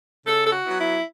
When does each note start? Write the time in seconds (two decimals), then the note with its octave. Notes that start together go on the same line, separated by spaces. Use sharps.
0.26 C#3 A4
0.45 A4
0.51 F#4
0.65 F#3 B3 E4
0.78 E4